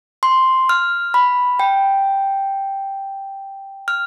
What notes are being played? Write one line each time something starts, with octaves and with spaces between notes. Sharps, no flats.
C6
F6
B5
G5
F6